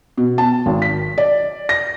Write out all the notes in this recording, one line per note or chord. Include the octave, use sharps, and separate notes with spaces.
B2
A5
G#1
B6
D5
A#6